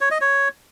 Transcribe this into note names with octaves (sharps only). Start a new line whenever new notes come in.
C#5
D#5
C#5